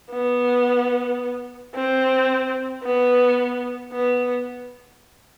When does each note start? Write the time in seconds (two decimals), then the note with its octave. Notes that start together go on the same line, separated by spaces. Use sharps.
0.10 B3
1.75 C4
2.84 B3
3.92 B3